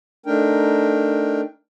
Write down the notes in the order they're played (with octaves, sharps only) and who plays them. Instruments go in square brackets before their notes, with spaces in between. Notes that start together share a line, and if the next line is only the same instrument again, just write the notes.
[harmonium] A3 D4 D#4 A#4 G5